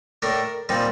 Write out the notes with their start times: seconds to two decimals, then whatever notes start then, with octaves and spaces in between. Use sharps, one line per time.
0.22 A2 A3 D4 A#4
0.69 A#2 G3 C4 D#4